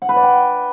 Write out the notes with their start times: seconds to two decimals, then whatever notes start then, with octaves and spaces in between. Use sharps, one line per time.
0.02 F#5
0.09 B4
0.16 D5
0.23 G5